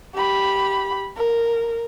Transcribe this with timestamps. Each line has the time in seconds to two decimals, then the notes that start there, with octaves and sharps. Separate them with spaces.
0.15 G4 B5
1.17 A#4